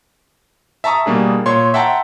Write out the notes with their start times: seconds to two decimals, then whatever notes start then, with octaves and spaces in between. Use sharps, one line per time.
0.84 E5 A5 A#5 C#6 D#6
1.06 B2 G3 A#3 D4 G#4
1.46 A#2 C#5 C6
1.74 E5 F#5 G5 A5 A#5 C6